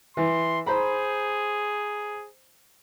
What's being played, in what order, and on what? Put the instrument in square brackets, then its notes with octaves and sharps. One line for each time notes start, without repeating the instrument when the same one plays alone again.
[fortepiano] E3 [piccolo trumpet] C6
[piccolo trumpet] G#4 [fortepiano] C5 A#5 B5